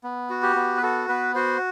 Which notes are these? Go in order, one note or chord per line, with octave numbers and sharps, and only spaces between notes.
B3
F#4
G4
B3
B4
F#4 A4
B3 B4
F#4 C5